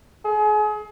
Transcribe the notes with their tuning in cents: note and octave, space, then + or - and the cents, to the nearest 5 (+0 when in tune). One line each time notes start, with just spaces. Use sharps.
G#4 +35